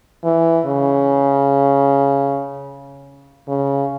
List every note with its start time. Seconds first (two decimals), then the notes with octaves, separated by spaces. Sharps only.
0.24 E3
0.66 C#3
3.48 C#3